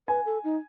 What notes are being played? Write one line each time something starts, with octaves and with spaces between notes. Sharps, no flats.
B4 G#5
A4
D#4